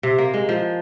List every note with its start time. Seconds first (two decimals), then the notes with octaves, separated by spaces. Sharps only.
0.03 C3
0.18 A#3
0.34 G#3
0.49 F3